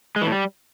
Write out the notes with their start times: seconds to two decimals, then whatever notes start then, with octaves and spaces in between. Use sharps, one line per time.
0.16 G#3
0.21 E3
0.27 A2
0.32 G3